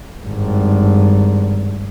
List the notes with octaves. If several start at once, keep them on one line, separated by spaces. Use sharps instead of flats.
G#1 G2